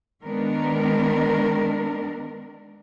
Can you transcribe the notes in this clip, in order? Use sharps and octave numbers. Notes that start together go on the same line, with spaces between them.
D#3 G#3 B3 D4 A#4